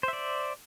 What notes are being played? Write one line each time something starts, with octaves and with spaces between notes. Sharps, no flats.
C5 D5 E5